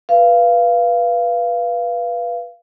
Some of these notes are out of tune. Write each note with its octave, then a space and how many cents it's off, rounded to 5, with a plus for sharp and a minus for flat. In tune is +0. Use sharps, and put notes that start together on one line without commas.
B4 -15 F5 -20